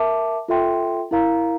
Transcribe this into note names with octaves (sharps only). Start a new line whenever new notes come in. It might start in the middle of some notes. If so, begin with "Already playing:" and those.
Already playing: A#4 E5 A5 D6
F4 A4 E5 G5 C6
E4 A#4 F5 A#5